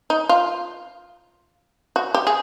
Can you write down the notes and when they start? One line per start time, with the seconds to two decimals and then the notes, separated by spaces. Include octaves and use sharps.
0.10 D#4
0.29 F4
1.96 F#4
2.15 G4
2.27 G#4